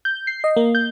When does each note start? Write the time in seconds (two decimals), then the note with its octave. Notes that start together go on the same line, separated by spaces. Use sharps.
0.05 G6
0.27 C7
0.44 D#5
0.57 A#3
0.75 G6